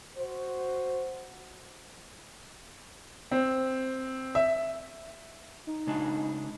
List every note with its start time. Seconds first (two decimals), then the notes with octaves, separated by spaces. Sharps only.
0.16 F#4 C5
3.31 C4
4.35 E5
5.67 D#4
5.87 C#3 G#3 D4